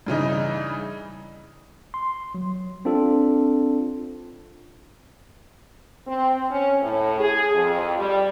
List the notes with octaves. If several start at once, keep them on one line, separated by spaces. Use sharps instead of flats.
G2 C#3 E3 D#4
C6
F#3
C4 D4 F4 A4
C4
C#4
A2
G#4
F2
G3